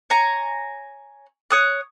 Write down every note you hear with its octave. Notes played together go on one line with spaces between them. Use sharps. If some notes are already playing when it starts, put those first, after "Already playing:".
C#5 G#5 A#5
C#5 D#6 F#6